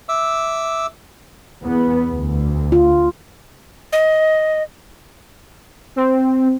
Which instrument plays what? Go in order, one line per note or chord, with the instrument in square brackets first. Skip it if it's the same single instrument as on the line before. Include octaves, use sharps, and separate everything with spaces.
[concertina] E5 D6 E6
[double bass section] E2 B3
D2
[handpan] F4
[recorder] D#5
[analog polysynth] C4